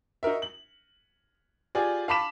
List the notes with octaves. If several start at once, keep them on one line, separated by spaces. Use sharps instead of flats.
D#4 F#4 A#4 E5
F#7
F4 G4 G#4 D5
F5 A5 B5 D6 B6 E7